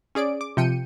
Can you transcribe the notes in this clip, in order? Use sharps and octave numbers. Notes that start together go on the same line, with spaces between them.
C#4 G#4 D5 D7
D6
C3 F3 G5 C#7 D#7